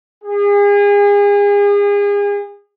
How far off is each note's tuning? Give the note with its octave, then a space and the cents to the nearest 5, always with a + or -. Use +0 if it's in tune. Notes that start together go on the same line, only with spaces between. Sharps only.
G#4 -35